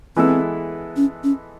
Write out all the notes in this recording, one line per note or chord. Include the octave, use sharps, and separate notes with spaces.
E3 G#3 B3 C4 E4 A4
C#4
C#4